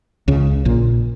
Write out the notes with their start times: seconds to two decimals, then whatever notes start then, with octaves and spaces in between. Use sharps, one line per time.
0.28 C#2 C#3
0.65 A#1 A#2